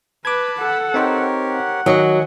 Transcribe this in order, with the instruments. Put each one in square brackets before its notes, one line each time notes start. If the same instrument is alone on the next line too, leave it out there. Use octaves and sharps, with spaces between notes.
[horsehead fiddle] B4 [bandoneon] A5 B5 [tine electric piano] D6 G#6
[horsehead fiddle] A4 F#5
[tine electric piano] C4 D#4 C5 [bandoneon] G4 A#4 C#5
[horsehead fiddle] F#5
[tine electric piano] D#3 D#5 C#7 [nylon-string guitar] F#3 [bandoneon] G#5